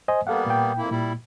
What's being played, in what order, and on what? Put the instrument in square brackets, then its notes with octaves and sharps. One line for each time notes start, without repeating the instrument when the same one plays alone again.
[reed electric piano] C5 D#5 G#5
[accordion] G3 A#3 B3 [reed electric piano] A4 F5 F#5
[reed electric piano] A#2 G5
[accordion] F2 A#3 E4
[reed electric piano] A#2 [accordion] G3 E4